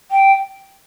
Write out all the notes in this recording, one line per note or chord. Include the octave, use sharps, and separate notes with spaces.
G5